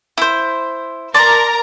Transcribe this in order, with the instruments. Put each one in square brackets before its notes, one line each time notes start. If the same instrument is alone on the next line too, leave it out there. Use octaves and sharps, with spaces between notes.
[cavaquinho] E4 C5
[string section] A#4 A#5 [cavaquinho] D5 A5 C6